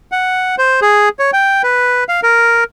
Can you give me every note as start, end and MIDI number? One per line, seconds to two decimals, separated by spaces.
0.12 0.55 78
0.58 0.80 72
0.82 1.09 68
1.19 1.31 73
1.33 1.62 79
1.63 2.04 71
2.09 2.20 77
2.23 2.64 70